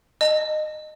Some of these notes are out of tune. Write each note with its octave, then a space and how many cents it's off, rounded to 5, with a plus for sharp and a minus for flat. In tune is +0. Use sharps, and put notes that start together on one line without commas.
D#5 -20 A5 +0